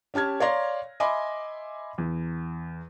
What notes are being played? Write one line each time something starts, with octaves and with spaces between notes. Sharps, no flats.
C#4 G4 A5 F6 G#6
C#5 D5 F5 A#5 C6 A#6
D#5 E5 G#5 B5 C6 D6
E2